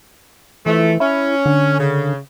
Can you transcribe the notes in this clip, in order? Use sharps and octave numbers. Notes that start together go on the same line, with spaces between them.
E3 F3 A3
C#4 E4
D3
C#3